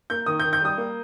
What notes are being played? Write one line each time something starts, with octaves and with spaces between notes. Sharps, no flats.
A#3 G6
D#3 D#6
G6
D#3
G6
G3 D#6
A#3